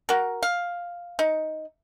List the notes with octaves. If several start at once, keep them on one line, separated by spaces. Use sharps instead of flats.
F#4 A#4
F5
D#4